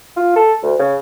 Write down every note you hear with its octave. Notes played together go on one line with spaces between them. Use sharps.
F4
A4
D2
C#3